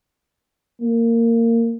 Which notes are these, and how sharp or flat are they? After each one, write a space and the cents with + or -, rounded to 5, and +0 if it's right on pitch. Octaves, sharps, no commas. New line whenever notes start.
A#3 -20